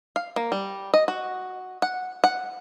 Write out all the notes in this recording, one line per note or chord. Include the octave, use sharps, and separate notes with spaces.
F5
A#3
G3
D#5
F#4
F#5
F#5